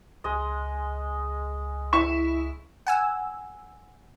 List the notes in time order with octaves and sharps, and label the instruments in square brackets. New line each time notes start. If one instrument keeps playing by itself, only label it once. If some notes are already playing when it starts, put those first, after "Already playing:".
[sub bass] C#2 [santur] G#3 D#5
[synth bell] E4 [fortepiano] C#6
[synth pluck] F#5 G#5 E6